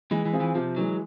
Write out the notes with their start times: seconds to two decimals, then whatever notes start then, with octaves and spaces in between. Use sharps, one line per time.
0.11 E3 G#3
0.25 E3
0.33 C4 F4 G#4
0.40 E3
0.55 C3 F3
0.76 E3 F#3 G#3